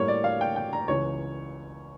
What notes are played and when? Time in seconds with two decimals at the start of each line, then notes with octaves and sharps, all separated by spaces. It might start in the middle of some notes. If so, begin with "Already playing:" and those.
Already playing: A2 G3 A#3 C#5
0.08 D5
0.24 F5
0.41 G5
0.56 G5
0.73 A#5
0.88 C#2 C#3 E3 C#5